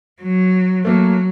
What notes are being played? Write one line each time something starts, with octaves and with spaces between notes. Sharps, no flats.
F#3
F#3 A3 A#3